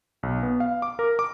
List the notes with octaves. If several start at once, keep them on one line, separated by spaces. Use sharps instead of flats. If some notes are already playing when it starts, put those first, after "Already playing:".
B1
B3
F5
D6
A#4
D6